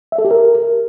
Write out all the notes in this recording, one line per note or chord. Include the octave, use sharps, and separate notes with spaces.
E5
A4
G4
A#4